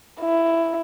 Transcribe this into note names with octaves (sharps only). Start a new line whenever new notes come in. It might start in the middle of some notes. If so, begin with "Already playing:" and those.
E4